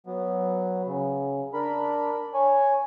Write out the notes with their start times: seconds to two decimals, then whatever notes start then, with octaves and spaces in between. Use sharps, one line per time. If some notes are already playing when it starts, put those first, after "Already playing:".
0.07 F#3 B3
0.87 C#3
1.54 D4 A#4 B5
2.34 C#5 G#5